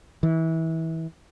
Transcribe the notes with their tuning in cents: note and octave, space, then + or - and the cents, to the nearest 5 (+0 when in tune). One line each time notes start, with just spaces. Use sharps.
E3 -25